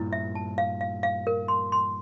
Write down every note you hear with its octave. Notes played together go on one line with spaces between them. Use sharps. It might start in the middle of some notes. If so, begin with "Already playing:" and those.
Already playing: G2 A#2 E4
E5
A5
F5
F5
F5
A#4
C6
C6